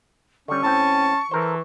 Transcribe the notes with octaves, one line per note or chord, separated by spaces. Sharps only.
D3 G3 C#4 C#6
A2 C4 A5
E3 A4 A#4 C5